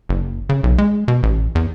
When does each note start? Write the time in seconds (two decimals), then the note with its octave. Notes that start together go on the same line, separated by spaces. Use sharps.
0.09 F#1
0.49 C#3
0.63 B1
0.78 G#3
1.08 B2
1.23 A1
1.55 E2